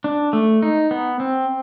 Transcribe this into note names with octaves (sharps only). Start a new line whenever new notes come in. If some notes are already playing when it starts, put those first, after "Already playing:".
D4
A3
D#4
B3
C4